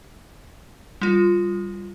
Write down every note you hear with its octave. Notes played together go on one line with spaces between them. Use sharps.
G3 F4